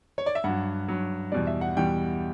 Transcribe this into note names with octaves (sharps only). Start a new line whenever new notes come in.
C#5
D5
E5
G2 F#3 F#5
G2 F#3
E2 B2 G3 D5
E5
F#5
E2 B2 G3 G5